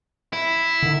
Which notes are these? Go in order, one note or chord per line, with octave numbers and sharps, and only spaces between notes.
E4
D3 D#3